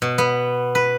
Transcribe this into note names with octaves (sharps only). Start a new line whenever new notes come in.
B2
B3
B4